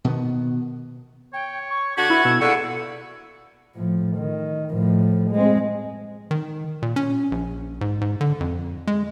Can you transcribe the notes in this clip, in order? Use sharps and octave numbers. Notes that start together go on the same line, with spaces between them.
B2 D#3 B3
C#5 G5
C#6
D3 F#4 G4 G#6
E4 B4
B2 E6
E2 A#2 D3 F#5 C#6 E6
A2 F3
D#3
A2 F3
G#3 C4
D#3
A#2
C#4
A#1
G#2
G#2
D3
F2
G#3